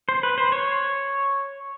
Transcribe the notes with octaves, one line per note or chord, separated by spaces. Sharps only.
C5
B4
C5
C#5